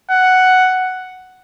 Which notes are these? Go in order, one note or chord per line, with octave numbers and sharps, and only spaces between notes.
F#5